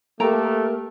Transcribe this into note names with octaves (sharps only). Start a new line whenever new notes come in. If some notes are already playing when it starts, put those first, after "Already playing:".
A3 A#3 G4 A4 A#4 G5 A#5